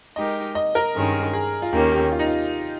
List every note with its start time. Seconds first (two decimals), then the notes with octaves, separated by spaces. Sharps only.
0.16 G#3 D#4 G4 A#4 D#5
0.55 D#5
0.75 A#4
0.95 G2 D#3 G#3 C#4
1.33 G#4
1.62 F4
1.72 D#2 D#3 A#3 C#4 G4
1.92 G4
2.12 F4
2.19 D#4
2.26 F4